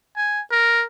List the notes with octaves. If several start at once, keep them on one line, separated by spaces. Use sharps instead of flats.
G#5
A#4